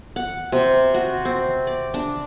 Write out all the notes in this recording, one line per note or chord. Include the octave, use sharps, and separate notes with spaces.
F#5
C3
F#4
C4
D5
D4